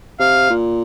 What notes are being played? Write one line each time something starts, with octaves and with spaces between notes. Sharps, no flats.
C3 F5
A#2